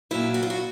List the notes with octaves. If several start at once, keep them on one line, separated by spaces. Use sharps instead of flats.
A#2 F#3 E4
F#4
F4
F#4